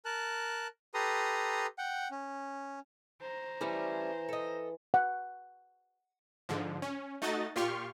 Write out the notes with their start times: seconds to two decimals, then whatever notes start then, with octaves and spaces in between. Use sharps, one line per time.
0.05 A#4 A5 F#6
0.94 G4 A4 B4 A#5 C6 D#6
1.78 F#5 G5
2.11 C#4
3.21 C5 A#5
3.61 E3 G3 A3 C#4
4.29 A4 D#5
4.94 F#5
6.49 G#2 D3 F3
6.82 C#4
7.22 A3 D#4 F#4 D#5 A6
7.56 A#2 F4 G4 C6 C#6 F6